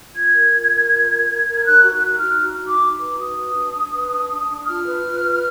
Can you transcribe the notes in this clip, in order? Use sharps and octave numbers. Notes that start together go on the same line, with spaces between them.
F4 G#6
A#4
F4
A#4
F4
A#4
A#4
A#4
G#6
D#4 F#6
F#4
F#6
D#4
F6
D#4
F#4
D#4
D6
D#4
D6
B4
F#4 D#6
B4
D4
D4
B4
D4
D4
D4
F4 F6
B4
F4
B4